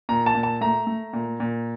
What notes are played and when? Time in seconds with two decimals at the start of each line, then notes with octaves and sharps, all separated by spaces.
0.09 A#2 A#5
0.26 A5
0.35 A#2
0.43 A5
0.61 A3 A#5
0.87 A3
1.13 A#2
1.40 A#2